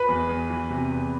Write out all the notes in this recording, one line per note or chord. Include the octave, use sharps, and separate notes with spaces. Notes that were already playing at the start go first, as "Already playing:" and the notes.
Already playing: B4 B5
E2
E2
E3
C3
E2